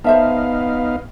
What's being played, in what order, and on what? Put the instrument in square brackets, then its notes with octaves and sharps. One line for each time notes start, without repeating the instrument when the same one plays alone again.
[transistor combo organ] B3 D#4 F5 [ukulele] C5 E5 A5